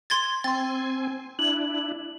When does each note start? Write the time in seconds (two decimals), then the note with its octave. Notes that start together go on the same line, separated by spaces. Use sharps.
0.10 C6 G#6 A6
0.44 C4 G5 G#5 C6 A6
1.39 D4 E4 F#7